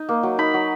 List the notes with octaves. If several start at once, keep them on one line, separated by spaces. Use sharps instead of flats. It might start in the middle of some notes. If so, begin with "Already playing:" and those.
Already playing: D#4
A#3
F#3
D#4 B5
F#3